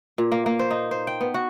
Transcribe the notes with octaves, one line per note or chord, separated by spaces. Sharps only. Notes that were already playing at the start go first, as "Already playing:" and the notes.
A#2
A#3
A#3
C5
D#4
C5
G5
B3
F#4